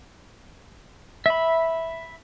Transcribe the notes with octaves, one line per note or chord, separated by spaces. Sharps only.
E5 B5